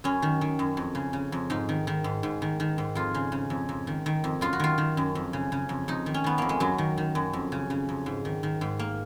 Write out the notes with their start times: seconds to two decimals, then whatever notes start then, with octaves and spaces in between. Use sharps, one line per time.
0.04 F#2 C#4
0.22 D#3
0.41 D#3
0.59 F#2
0.77 F2
0.95 C#3
1.13 C#3
1.32 F2
1.50 G#2 D#4
1.69 D#3
1.87 D#3
2.04 G#2
2.23 G#2
2.42 D#3
2.60 D#3
2.78 G#2
2.95 F2 F4
3.14 C#3
3.32 C#3
3.50 F2
3.69 F2
3.87 D#3
4.06 D#3
4.24 F2
4.41 F#2 F4
4.53 F#4
4.60 D#3 F4
4.78 D#3
4.97 F#2
5.15 F2
5.33 C#3
5.52 C#3
5.69 F2
5.88 F2 D#4
6.06 D#3
6.14 C#4
6.24 D#3 B3
6.38 F2 A#3
6.49 G#3
6.60 F#2 F#3
6.78 D#3
6.98 D#3
7.15 F#2
7.33 F2
7.52 C#3
7.70 C#3
7.89 F2
8.06 G#2
8.25 D#3
8.43 D#3
8.61 G#2
8.79 A#3